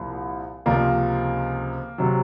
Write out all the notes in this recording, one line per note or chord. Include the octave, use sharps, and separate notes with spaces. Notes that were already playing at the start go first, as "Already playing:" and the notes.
Already playing: C2 A#2 F3
C#2 C3 F3 A#3
C3 F#3